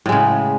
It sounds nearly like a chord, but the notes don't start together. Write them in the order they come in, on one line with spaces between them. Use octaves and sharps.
A2 G#3 C#3